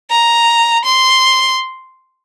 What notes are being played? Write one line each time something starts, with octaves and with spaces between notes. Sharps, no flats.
A#5
C6